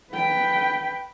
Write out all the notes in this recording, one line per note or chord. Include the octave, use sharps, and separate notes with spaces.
B4 G5